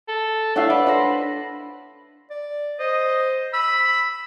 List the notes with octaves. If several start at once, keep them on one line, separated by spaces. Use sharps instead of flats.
A4
A3 D4 E4 C#5 F5 F#5 E6
B4 D5
D4 A4 C5 A#6
D5
C5 D#5
B5 E6